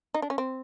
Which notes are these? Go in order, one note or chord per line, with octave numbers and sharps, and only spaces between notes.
D#4
D4
C#4
C4